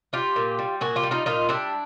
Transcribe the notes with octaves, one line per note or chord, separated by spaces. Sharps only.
G3 F4 G4
A#2
G3
A#2 F#4 G#4
F4 G4
G3
D#4 F4
A#2 D#4 F4
G3 D4 E4